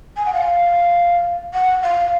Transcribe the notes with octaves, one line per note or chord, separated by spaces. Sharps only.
G#5
F#5
F5
F#5
F5